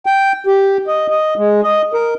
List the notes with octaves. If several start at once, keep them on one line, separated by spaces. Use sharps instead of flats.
G5
G4
D#5
D#5
G#3
D#5
A#4